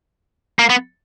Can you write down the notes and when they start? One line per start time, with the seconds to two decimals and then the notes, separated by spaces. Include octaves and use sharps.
0.59 A#3
0.70 B3